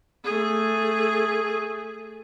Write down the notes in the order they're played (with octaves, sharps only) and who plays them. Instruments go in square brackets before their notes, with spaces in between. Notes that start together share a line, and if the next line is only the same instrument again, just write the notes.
[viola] A3 G#4